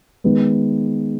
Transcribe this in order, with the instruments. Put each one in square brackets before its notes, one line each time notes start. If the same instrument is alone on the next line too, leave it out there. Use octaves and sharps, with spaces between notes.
[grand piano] D#3 G#3 B3